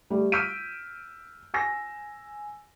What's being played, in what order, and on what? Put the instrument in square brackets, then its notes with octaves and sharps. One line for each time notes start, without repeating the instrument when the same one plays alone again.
[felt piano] G3 A3
E6 F6 G6 B6 D7 D#7
G#5 E6 A#6